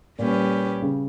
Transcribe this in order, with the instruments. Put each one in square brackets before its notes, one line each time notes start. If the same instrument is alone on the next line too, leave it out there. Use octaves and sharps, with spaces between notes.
[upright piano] A#2 [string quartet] G3 C#4 G4 B4
[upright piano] C#3